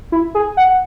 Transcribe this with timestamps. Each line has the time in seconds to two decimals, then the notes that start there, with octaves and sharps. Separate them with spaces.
0.12 E4
0.35 G#4
0.57 F#5